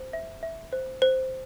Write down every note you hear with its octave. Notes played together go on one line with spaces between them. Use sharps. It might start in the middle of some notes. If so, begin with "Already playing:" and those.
Already playing: C5
E5
E5
C5
C5